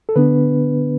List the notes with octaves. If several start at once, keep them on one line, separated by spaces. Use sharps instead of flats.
A4
D3 B3 D4 B4